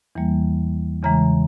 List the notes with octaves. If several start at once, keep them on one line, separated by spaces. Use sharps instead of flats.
E2 E3 G3 A#3
E2 C#3 E3 G#3 A#5